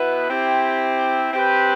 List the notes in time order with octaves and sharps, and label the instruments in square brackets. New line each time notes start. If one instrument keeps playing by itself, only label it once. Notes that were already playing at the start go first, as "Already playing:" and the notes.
Already playing: [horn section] B2 B3 E4 B4
C4 E4 G4
C4 G4 B4